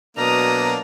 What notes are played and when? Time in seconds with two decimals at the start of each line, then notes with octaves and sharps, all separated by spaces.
0.17 B2 F#3 A#3 D4 A#5 D#6